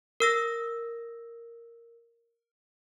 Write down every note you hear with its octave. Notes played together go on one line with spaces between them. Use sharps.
A#4 E6 A#6